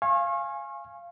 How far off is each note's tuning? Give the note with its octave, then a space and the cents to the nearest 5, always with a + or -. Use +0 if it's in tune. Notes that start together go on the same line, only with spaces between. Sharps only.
F5 -15 G#5 +0 C#6 -40